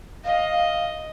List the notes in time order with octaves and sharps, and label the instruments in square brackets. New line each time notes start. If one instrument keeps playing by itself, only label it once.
[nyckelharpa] D#5 [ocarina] F5